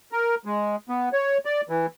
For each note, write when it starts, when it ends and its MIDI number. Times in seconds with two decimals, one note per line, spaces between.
0.12 0.35 70
0.45 0.76 56
0.89 1.09 59
1.13 1.38 73
1.45 1.61 74
1.69 1.86 52